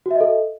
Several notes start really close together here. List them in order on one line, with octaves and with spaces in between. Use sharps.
F#4 E5 D#5 A4